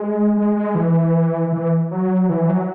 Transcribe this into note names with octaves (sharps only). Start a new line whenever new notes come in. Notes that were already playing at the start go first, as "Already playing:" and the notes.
Already playing: G#3
G#3
G#3
E3
E3
F#3
E3
F#3